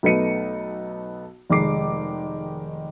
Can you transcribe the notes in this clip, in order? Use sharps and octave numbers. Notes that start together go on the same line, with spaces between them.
B1 A3 B3 D#4 C#7 D#7
F1 D#3 G#3 D6 C7